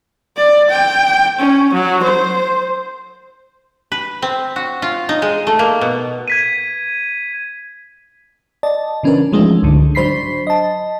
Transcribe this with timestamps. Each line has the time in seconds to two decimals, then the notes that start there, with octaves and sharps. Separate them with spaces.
0.37 D5
0.70 G5
1.39 C#4
1.74 F#3
2.03 C5
3.92 B4
4.22 C4
4.56 F#4
4.82 F4
5.09 D#4
5.22 G#3
5.47 A3
5.59 A#3
5.81 B2
6.28 G#6 B6 D#7
8.63 D5 D#5 A5
9.03 C#3 E3 C#4 D4 A#4 B4
9.32 E3 F3 G#3 A3 C#4 D#4
9.63 C#2 G#2 D3
9.95 F#3 D4 C5 B5 B6 C7
10.47 D#5 A5